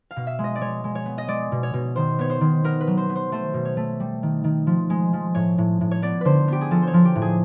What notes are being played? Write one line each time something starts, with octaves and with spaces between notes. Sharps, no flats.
F5
B2
E5
G#3
D#5
D5
G#3 C#5
G#3
C#5
B3
D#5
G#3 D5
B2
C#5
B2
D#3 C5
B3 C#5
C5
D#3
B3 A#4
B4
F#3
C5
B3
C5
A3 C5
B2
C#5
A3
G3
D#3
D#3
F3
G#3
F3
A2 C#5
A2
A2
C#5
B3 D5
D3 B4 C5
B3 G4
G#4
F3 A4
C5
C#5
F3
G4
A2
G#4